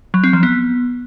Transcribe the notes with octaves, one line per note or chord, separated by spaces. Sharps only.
F#3
C4
F3
B3